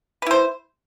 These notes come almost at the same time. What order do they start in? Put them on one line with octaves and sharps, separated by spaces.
B4 E4 C5